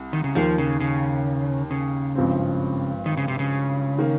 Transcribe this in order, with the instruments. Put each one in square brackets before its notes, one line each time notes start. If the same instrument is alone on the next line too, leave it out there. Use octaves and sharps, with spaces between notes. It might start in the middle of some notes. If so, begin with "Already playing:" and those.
Already playing: [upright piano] C2
[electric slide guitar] D#3
C#3
[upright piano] D#2 D#3 A#3 [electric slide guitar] F3
[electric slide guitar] C#3
C#3
C#3
[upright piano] G#1 G2 F3 C4
[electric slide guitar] D#3
C#3
C3
C#3
[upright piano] D#3 A#3